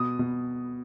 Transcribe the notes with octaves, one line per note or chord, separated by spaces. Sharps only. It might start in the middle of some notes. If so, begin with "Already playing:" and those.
Already playing: B2 D#6
B2